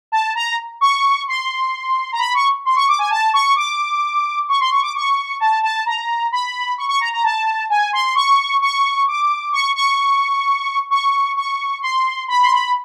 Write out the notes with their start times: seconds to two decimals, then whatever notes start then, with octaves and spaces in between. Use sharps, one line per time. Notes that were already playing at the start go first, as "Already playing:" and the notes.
0.12 A5
0.35 A#5
0.81 C#6
1.28 C6
2.13 A#5
2.19 B5
2.34 C#6
2.65 C6
2.76 C#6
2.88 D6
2.99 G#5
3.10 A5
3.33 C#6
3.56 D6
4.49 C#6
4.60 C6
4.71 C#6
4.82 D6
4.95 C#6
5.40 A5
5.63 A5
5.86 A#5
6.32 B5
6.78 C#6
6.89 C#6
7.01 A#5
7.12 A#5
7.24 A5
7.70 G#5
7.93 C6
8.15 C#6
8.62 C#6
9.08 D6
9.53 C#6
9.76 C#6
10.91 C#6
11.37 C#6
11.82 C6
12.28 B5
12.43 C6
12.51 B5